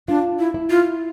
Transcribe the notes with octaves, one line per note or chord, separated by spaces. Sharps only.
D4 F4
E4
E4
F4